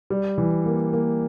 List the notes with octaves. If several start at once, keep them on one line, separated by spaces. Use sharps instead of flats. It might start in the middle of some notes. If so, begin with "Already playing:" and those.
G3
E3
A#3
A#3